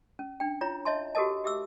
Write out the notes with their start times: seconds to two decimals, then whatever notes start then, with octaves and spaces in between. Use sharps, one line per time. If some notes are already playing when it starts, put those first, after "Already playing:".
0.19 C#4
0.40 D4 G5
0.61 E4 F4 C#5 A#5
0.85 C#5 D#5 E5 A5 C6
1.15 F#4 G4 A4 A#4 D#5 A5
1.44 G4 E5 D6 E6